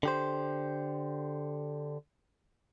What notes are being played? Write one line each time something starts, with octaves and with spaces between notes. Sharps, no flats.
D3 G4 C5